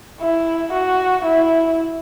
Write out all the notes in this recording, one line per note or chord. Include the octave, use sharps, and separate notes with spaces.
E4
F#4
E4